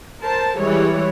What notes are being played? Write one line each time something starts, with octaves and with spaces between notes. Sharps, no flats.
A#4 C5 A5
E3 G3 G#3 C#5